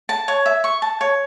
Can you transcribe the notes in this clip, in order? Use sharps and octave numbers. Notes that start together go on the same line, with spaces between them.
A5
C#5
E5
C#6
A5
C#5